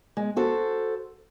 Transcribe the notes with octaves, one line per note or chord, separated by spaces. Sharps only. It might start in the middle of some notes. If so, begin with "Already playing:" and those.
G#3
F#4 A4 C5